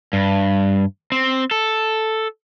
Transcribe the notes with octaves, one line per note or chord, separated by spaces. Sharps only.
G2
C4
A4